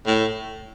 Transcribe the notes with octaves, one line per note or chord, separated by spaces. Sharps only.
A2